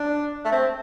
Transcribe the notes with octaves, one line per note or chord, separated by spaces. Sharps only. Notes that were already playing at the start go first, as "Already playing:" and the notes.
Already playing: D4
A3
C4